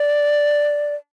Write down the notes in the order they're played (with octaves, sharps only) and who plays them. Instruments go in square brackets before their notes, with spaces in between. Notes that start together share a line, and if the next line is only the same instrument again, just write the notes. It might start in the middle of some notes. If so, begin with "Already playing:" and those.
Already playing: [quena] D5